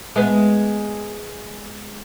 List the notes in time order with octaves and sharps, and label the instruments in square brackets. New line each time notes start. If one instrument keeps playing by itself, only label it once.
[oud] G#3 B3